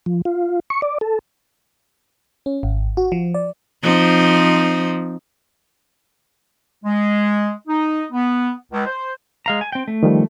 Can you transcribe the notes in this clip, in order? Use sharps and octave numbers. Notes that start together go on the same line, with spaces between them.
F3
F4
C#6
D5
A4
C#4
G#1
F#4
F3
D5
F3 C4 D#4
G#3
D#4
B3
C#2
C5
G#3 F5 A#5
G#5
C4 G5
A3
D#3 F3 G3